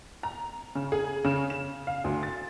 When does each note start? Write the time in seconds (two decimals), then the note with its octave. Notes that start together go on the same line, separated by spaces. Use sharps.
0.23 A#5
0.75 C#3
0.92 G#4
1.24 C#3
1.50 E7
1.87 F5
2.04 D2
2.23 A6